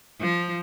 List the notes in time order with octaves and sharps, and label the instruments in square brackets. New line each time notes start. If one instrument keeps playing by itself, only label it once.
[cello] F3